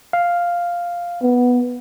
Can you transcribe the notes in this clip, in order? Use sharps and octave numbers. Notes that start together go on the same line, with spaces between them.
F5
B3